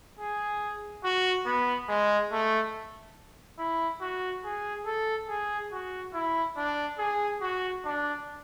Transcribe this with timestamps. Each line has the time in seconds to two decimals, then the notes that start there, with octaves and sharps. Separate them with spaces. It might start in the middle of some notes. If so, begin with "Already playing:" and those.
0.19 G#4
1.04 F#4
1.46 B3
1.89 G#3
2.32 A3
3.59 E4
4.01 F#4
4.45 G#4
4.86 A4
5.28 G#4
5.72 F#4
6.14 E4
6.57 D4
6.98 G#4
7.41 F#4
7.85 D4